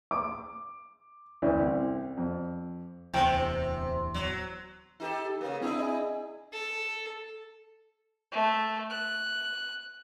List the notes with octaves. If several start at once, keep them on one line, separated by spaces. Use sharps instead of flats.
D6
D2 E3 C#4 D5
C2
F2
D1 E2 C3 C5 G5 G#5
F#3
D#4 G4 A4
C#3 A#3
C4 D4 E4 G#4
D#5 G#5
A4
A3
F#6